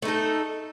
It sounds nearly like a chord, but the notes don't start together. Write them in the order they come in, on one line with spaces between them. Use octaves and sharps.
A3 D#4 A4